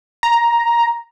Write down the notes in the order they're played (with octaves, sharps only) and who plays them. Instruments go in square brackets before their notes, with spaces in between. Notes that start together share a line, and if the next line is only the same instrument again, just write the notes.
[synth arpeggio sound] A#5